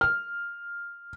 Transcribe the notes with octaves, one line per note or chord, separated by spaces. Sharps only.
F6